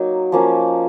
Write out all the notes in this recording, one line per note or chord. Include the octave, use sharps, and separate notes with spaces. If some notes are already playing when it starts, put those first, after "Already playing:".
Already playing: F#3 A#3 D#4
F3 A#3 C#4